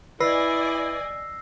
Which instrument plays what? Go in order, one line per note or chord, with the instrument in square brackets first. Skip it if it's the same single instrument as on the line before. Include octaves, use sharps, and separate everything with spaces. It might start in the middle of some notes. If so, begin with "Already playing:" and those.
[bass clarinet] E4 [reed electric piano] B4 [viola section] D5 D#5 G#5 [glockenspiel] E6 A#6 C7